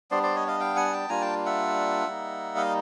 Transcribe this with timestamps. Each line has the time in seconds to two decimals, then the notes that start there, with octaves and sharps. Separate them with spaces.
0.11 G3 B3 D4 C5 D5
0.23 C5 D5
0.35 C#5 D#5
0.47 D#5 F5
0.60 F5 G5
0.76 F#5 G#5
0.93 G5 A5
1.09 G3 A#3 D4 F4 G#5 A#5
1.22 G5 A5
1.46 E5 F#5
2.07 G3 A#3 D#4
2.56 D#5 F5